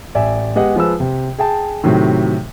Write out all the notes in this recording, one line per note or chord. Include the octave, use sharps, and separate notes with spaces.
A1 D5 E5 G#5
G#3 B3 G4 G#4 D#5 F#5
F3 G#3 B4 E6
C3
G#4 G5 A5
A2 C3 D#3 F#3